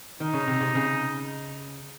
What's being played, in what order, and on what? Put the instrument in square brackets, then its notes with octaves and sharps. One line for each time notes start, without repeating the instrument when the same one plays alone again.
[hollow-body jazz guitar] D#3 [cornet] D#4
[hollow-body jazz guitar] C#3
C3
C3
C#3